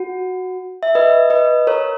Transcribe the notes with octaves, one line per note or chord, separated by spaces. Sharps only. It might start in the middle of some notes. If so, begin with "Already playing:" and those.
Already playing: F#4
E5
B4 D#5
B4 D#5
A#4 C#5